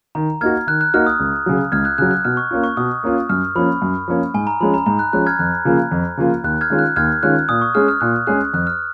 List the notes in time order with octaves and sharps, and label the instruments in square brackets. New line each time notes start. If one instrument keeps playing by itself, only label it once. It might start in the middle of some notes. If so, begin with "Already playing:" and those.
[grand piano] D#3 [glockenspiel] A#5
[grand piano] A#3 D#4 F#4 [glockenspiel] F6 G#6
[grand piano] D#3 [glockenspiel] F#6
[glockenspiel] F#6
[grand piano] A#3 D#4 F#4 [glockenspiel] F6
[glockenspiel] D#6
[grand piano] C#2
C#3 F#3
[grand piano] C#2 [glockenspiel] F6 G#6
[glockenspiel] F#6
[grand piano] C#3 F#3 [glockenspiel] F#6
[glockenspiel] F#6
[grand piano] B2 [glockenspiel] F6
[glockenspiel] C#6
[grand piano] A#3 C#4 F4
[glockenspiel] C#6
[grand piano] B2 [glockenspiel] D#6
[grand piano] A#3 C#4 F4
[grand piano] F#2 [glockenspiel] F6
[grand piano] F3 A#3 C#4 [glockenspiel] B5
[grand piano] F#2
F3 A#3 C#4
[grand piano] G#2 [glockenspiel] G#5
[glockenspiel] A#5
[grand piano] F3 G#3 C#4 [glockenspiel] B5
[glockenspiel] A#5
[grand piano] G#2 [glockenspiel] A#5
[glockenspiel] F#6
[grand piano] F3 G#3 C#4 [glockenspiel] F#6
[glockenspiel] F6 G#6
[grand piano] F2 [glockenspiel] F#6
[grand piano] C#3 F3 A#3 F4
F2
C#3 F3 A#3 F4
[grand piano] D#2 [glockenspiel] F#6
[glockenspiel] F6 G#6
[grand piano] D#3 G#3 C#4 F4
[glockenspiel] F#6
[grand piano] D#2 [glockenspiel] F6 G#6
[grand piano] D#3 G#3 C#4 F4 [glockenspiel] F#6
[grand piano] A#2 [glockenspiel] D#6
[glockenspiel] C#6
[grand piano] G#3 C#4 G#4 [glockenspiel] F6
[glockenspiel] F6
[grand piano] A#2 [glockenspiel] F#6
[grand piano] G#3 C#4 G#4 [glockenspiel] F#6
[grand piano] F2 [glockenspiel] F#6
[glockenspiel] F6